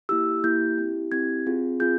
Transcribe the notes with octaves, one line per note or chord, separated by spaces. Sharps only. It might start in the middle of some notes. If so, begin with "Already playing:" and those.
A#3 E4 G4 E6
A#3 E4 G4 G6
C4 E4 G4
C4 E4 G4 G#6
C4 F4 G#4
C4 F4 G#4 G6